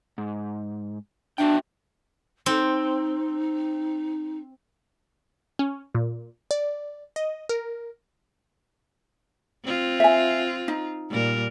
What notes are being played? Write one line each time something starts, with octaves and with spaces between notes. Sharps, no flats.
G#2
D4 F#4 E5 G5
C4 D#4
C#4
A#2
D5
D#5
A#4
C4 F4
E5 G#5
D#4
A#2 G3 A#4